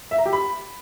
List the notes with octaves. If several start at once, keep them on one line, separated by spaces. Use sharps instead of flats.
E5
A#5
G4
B5